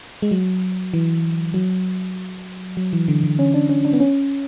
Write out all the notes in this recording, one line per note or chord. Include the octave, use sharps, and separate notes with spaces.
G#3
F#3
E3
F#3
F#3
E3
D3
D3
C#4
D4
C#4
D4
B3
C#4